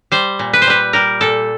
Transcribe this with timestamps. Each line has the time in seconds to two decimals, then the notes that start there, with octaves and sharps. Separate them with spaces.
0.12 G3 C5
0.39 A#2
0.53 B4
0.62 C5
0.67 G3 B4
0.93 G3 A#4
1.21 A#2 A4